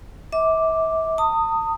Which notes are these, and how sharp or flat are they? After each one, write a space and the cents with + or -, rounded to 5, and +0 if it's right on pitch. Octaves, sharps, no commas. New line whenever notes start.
E5 -40 D6 +0
A5 +45 D#6 +0